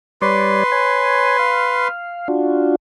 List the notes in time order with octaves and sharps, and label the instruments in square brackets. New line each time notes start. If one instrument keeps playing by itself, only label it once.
[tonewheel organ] G3 C#5 D5 [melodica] B4 C6
[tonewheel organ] C#5 G#5
F5
D4 F4 F#4